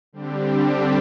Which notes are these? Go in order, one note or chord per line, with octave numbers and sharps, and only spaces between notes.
D3 G3 C4 D4 G4